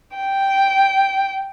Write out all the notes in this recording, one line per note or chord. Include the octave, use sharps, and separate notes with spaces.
G5